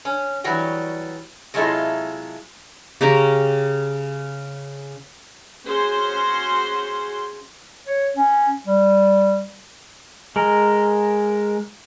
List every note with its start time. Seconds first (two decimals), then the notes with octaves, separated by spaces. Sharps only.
0.05 C#4
0.44 E3 F#3 G3 F#4
1.54 C3 F#3 G#3 E4 F4 A4
3.01 C#3 G4 A#4 C#6
5.66 C#4 F#4 G#4 C5 C6
7.87 C#5
8.16 C#4
8.66 G3
10.36 G#3 A#4